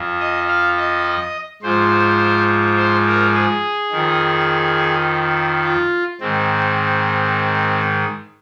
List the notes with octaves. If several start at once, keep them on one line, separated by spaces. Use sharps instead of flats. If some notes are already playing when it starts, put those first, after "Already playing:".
Already playing: F2 F3
D#5
F5
D#5
G#2 F3 C5
C5
A#4
G#4
F2 D#3
F4
G#2 D#3 C4